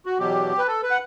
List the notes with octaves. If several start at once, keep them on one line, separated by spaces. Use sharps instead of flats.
F#4
E2 B2 F#3 G4
B4
A4
B4
F#5